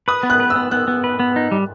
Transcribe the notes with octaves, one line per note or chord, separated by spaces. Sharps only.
B4 D#6
B3
F#6
B4
E6
B3
B3 F#6
B3
B4
B3
D#4
G3